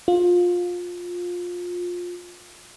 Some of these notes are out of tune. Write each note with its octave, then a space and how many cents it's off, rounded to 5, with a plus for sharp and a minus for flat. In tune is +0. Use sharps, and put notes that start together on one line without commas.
F4 +20